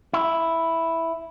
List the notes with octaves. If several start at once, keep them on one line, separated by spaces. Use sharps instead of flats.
E4